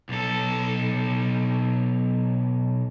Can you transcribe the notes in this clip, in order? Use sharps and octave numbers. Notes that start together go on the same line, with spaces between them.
B1 A4